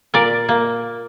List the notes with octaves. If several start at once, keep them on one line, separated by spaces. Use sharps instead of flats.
A#2 A#4 D5
A#3